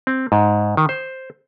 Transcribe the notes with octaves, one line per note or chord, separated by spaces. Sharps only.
C4
G#2
D#3
C5